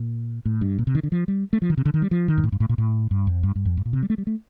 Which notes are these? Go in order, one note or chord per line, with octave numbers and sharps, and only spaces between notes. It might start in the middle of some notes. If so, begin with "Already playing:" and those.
Already playing: A#2
A2
G2
A#2
C3
D#3
D3
F3
G3
A3
F3
D#3
C3
D3
D#3
G3
F3
D#3
G2
A2
G2
A2
A#2
A2
G2
F2
G2
G2
F2
G2
A#2
C3
G3
A3
G3
A3